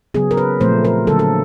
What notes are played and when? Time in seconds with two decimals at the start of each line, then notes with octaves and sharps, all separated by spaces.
0.14 C#3 F#3 B3 G#4
0.31 A#4
0.37 B4
0.60 A#2 F3 A3 C4 C5
0.85 A#4
1.07 D3 F#3 A#3 A4
1.19 A4